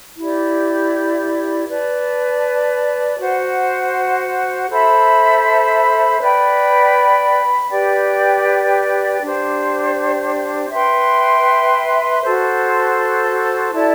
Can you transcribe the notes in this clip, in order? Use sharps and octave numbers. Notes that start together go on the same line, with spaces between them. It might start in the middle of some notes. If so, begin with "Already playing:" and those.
E4 G4 D5
B4 D5 A5
F#4 C5 F#5
A4 C5 E5 B5
B4 D5 G5 B5
G4 B4 D5 G5
D4 G4 C5
B4 E5 G5 C6
F#4 A4 C5
E4 A4 D5 A5